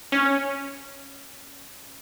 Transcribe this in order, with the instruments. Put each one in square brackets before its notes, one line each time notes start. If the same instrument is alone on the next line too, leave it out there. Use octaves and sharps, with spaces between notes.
[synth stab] C#4